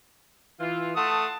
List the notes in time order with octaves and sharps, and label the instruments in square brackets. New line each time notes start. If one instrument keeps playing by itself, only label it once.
[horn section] E3 F4
[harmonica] A3 D#6 [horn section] F#5 A5 C6